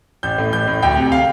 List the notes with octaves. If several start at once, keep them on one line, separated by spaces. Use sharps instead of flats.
A1 G6
A2
A1 G6
A2
D2 G5
C3
F5